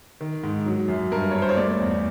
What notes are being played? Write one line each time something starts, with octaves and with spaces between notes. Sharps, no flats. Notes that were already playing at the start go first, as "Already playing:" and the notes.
D#3
G#2
F#3
F#2
G2 A#4
G2 C#5
C5
C#5
A3 D5
E2